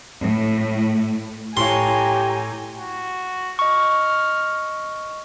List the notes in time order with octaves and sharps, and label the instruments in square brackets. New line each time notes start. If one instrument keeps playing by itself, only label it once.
[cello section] A2
[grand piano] A2 C#5 [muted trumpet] G4 [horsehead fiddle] G#5 A#5 [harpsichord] C6
[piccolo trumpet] F#4
[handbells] D#5 C#6 [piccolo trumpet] F6